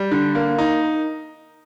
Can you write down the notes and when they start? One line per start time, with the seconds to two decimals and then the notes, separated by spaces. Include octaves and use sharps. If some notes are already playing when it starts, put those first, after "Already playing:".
Already playing: G3
0.11 D3
0.35 A#3
0.58 D#4